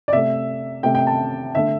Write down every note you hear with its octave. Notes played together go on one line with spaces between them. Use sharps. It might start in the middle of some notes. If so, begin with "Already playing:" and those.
D5
C3 A3 E5
C3 A3 G5
G5
A5
D3 A3 E5